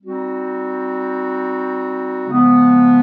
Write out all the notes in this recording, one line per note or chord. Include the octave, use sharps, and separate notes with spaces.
G3 C4 D#4 F#4
C#3 F3 G#3 B3